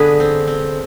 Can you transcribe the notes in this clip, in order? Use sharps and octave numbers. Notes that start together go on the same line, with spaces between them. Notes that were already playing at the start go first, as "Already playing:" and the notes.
Already playing: D3 B3 D4 G#4 B4 D5
C4
C4